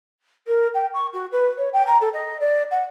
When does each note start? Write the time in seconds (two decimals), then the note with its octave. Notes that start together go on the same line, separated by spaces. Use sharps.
0.47 A#4
0.74 G5
0.93 C#6
1.13 F#4
1.32 B4
1.57 C#5
1.73 G5
1.86 A#5
2.00 A4
2.13 D#5
2.40 D5
2.71 F#5